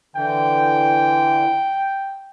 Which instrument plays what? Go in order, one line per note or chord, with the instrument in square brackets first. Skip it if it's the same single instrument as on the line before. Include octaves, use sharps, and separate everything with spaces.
[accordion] D3 E3 [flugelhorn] G5